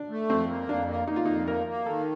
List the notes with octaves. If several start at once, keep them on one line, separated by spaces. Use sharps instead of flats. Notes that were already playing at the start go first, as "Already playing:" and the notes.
Already playing: D4
A3
F2 C4
A#3
F2 D4
A#3
A#3 D#4
F4
F2 D#4
A#3 A#4
A#3
D#3 A4